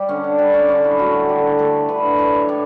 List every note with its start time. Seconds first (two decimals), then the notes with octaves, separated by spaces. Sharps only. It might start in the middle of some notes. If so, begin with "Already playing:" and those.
Already playing: G3 G4
0.09 D3 C#4
0.24 D4
0.39 G3 D4
0.54 C#4
0.68 D3 C#4
0.84 E4
0.99 A3 F#4
1.29 D3 G4
1.59 A3 A4
1.89 D3 B4
2.19 E3 C#5
2.49 A2 D5